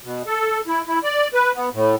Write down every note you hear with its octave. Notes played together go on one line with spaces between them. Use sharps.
B2
A4
E4
E4
D5
B4
B3
A2